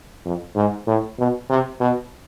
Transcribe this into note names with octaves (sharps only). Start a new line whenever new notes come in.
F2
G#2
A2
B2
C3
B2